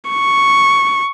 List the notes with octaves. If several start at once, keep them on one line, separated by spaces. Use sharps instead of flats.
C#6